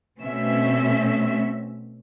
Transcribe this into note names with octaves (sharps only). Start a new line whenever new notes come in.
B2 A3 C4 C#4 E5